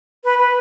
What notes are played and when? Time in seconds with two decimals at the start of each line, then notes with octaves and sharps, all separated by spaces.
0.24 B4
0.39 B4